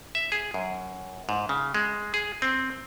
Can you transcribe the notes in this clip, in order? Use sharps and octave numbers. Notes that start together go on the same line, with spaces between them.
E5
G#4
F#2
G#2
C#3
G#3
G#4
C4